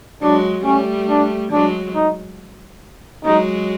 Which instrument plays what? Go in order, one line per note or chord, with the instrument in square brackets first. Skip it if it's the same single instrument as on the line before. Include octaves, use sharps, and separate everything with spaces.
[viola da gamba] F#3 G#3 [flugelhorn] D4
[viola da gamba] G3 A3 [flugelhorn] C#4
[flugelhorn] D4
[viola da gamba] F#3 G#3 [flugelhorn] D4
[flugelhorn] D#4
[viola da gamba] F#3 G#3 [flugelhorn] D#4